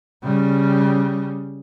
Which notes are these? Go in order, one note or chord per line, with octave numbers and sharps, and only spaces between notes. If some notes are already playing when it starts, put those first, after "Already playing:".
C#3 G3